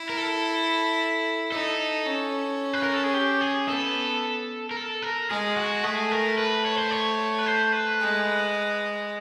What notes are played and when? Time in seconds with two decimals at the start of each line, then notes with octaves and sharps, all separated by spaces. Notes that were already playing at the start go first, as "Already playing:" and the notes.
Already playing: E4
0.09 A#4
0.17 A4
1.52 D#4 A4
2.06 C#4
2.73 B4
2.83 A#4
2.94 A4
3.03 G#4
3.14 G4
3.41 G#4
3.68 B3 A4
4.71 A#4
4.77 A4
5.02 A#4
5.30 G#3 G#4
5.57 F#4
5.84 A3 G#4
6.11 A#4
6.38 B4
6.66 C#5
6.78 C5
6.91 C#5
7.38 B4
7.46 C5
7.72 B4
8.00 G#3